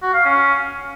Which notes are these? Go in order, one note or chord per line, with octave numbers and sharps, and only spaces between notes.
F#4
F5
C#4